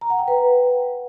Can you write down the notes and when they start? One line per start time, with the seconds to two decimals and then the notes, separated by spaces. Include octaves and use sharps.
0.01 A#5
0.10 F#5
0.19 G5
0.28 B4